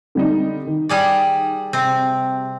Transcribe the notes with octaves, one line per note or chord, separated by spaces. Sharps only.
D3 G3 D#4
D#3
G3 G#4 D5
C3 C4